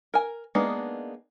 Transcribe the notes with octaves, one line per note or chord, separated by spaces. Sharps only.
A#4 G#5
G#3 A#3 B3 D4 D#4